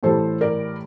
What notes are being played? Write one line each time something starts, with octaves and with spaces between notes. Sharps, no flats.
A2 E3 G3 A4 C5
A#4 D5